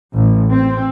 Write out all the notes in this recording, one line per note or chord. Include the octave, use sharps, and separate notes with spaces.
A1
C4